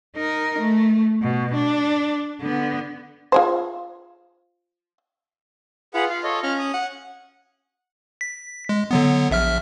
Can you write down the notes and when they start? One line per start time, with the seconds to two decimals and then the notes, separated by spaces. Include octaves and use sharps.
0.16 D#4 A#4
0.59 A3
1.23 B2
1.54 D4
2.41 D3 B3
3.32 F4 G#4 C5
5.94 F4 G#4 B4 F#5
6.10 F5
6.24 A4 C#5 D#5
6.43 C#4 F6
6.59 D#6
6.74 F#5
8.21 B6
8.69 G#3
8.91 D3 F#3 B3
9.31 A#1 E5 F6